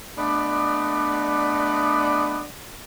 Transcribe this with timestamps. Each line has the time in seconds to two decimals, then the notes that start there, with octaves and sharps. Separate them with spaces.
0.18 A3 B3 D4 D5 D#5 F#5